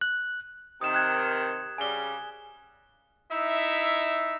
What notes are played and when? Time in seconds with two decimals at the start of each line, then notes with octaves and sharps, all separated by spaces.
0.01 F#6
0.81 C3 D#3 D#6 E7
0.94 F#6 G#6
1.78 C#3 G3 G#5 G7
3.30 D#4 E4 E5